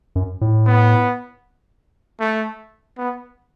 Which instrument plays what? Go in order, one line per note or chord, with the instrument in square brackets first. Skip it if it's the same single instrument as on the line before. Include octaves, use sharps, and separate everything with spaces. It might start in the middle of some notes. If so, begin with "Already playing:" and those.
[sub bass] F#2
A2
[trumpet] B3
A3
B3